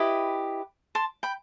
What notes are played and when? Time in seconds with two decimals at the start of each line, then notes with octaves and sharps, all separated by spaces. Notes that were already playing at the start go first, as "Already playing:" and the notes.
Already playing: E4 G4 B4 D#5
0.95 A5 C6
1.23 G5 B5